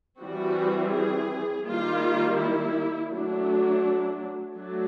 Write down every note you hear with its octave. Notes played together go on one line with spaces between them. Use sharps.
E3 G3 C4 F#4
G#4
D#3 G3 A#3 F4
E4
F#3 A3 D4
F#3 A3 D4